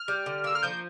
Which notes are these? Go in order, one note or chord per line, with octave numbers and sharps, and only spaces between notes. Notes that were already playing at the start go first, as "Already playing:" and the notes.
Already playing: F6
G3
D3
A#3 E6
F6
F3 G6